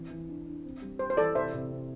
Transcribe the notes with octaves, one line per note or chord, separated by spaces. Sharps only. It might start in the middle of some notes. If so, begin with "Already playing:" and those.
Already playing: E3 C4
E3
D4
D4
C4
G3
G4 C5
C5
E3 A4 D5
C3 C5 E5
C3
C4